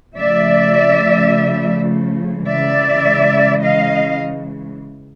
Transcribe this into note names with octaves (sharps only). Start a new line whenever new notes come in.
C#3 F3 A3 D5 E5
C#3 E3 G#3 D5 E5
D#5 F5